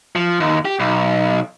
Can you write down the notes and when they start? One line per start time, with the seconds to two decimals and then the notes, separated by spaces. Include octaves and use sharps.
0.16 F3
0.40 D#2
0.65 G4
0.80 B1